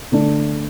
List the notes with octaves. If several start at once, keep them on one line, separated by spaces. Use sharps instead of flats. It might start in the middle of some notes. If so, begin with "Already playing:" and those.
D3 A3 D4